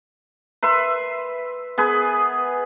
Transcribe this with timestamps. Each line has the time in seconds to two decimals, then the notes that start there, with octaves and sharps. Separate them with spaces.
0.63 B4 E5 C6
1.78 B3 G#4 B4